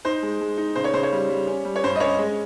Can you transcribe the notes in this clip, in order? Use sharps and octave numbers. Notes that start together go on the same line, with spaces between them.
D#4 C5
G#3
G#3
D#4
C#3 C5
C#5
C#3 C5
C#5
G3
G3
C#4
G3
C#5
G2 C5
D#5
C#4 C#5
G#3